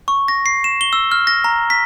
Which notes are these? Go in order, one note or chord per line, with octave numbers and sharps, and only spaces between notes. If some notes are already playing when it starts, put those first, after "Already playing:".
C#6
A#6
C7
E7
G7
E6
F6
A#6
A#5
B6